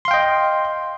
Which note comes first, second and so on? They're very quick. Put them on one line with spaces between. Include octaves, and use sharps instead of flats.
C6 F5 G5 D#5